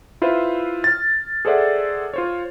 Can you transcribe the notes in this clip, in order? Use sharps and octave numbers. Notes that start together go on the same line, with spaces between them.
E4 F4 B4 C5 E5
F6 A6
G#4 A4 C5 D5 E5 F#5
F4 C5 C#5